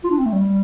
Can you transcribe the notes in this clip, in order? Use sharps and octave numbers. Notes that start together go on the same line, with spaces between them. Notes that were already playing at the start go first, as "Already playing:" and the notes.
F4
D4
C4
A3
G3